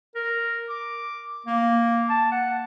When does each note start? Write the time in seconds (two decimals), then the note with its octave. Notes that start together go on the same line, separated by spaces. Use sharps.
0.15 A#4
0.69 D6
1.46 A#3
2.09 A5
2.32 F#5